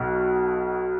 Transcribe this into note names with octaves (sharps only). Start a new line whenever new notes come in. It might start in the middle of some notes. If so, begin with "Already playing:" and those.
Already playing: B1 B2